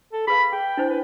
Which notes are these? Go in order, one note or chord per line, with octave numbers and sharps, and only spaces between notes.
A4
G#4 B4 F5 B5
G#4 G5
D4 E4 C5
B4